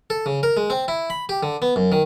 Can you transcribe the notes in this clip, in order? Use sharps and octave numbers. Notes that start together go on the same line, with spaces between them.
A4
C#3
A#4
G#3
C4
E4
B5
G4
D3
B3
F#2
D#3